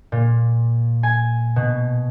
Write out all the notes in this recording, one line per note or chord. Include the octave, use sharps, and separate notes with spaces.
A#2
G#5
B2